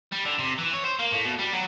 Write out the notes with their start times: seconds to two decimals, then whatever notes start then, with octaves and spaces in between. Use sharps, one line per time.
0.12 G3
0.25 D3
0.39 C3
0.58 E3
0.73 C#5
0.85 C5
0.99 A#3
1.12 A2
1.25 B2
1.39 G3
1.53 F#3